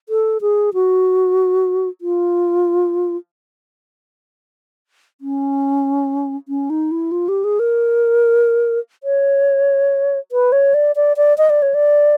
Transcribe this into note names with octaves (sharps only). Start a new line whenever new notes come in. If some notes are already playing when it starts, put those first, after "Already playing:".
A4
G#4
F#4
F4
C#4
C#4
D#4
E4
F4
G4
G#4
A#4
C#5
B4
C#5
D5
D5
D5
D#5
D5
C#5
D5